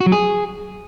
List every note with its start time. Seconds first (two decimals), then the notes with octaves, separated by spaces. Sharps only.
0.01 F#4
0.06 F#3
0.12 G#4